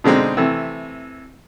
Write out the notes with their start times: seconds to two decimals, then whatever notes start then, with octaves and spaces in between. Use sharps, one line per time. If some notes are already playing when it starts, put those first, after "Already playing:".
0.04 B2 D3 G#3 C4 D#4
0.37 C3 E3 A3